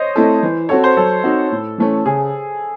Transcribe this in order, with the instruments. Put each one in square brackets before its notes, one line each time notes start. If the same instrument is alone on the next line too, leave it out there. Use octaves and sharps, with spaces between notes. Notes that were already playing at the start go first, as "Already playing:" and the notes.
Already playing: [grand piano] C5 C#5 D#5
[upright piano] A3 C4 E4 A4
E3
[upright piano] C4 F#4 A4 [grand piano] C#5
[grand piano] C5
[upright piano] F#3 [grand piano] A4
[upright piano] C4 D#4 F#4
A2
E3 A3 C#4
[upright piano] C#3 [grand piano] G#4